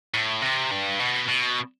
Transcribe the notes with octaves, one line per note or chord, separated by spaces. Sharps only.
A2
C3
G2
B2
B2